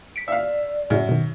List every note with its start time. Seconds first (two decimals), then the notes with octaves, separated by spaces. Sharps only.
0.16 B6 C#7 D7
0.28 D5 E5 F5
0.90 F#2 A2 C#3
1.09 B2 D#3